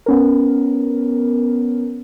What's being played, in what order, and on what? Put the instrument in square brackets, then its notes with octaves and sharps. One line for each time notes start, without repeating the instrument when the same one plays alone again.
[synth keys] B3 C#4 A#4